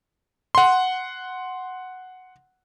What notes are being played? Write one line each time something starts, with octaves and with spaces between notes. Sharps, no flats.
F#5 C6